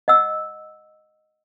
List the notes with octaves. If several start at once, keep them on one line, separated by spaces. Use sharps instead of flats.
D#5 F#5 E6